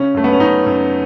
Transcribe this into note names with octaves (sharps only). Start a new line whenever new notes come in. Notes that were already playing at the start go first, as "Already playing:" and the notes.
Already playing: C#3 C#4
F#2 A3
B3
C#4
F#2 D#4
F#2